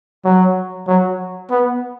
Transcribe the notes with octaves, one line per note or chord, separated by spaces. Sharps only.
F#3
F#3
B3